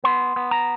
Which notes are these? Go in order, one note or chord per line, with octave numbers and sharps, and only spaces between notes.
B3 C6
B3
A#5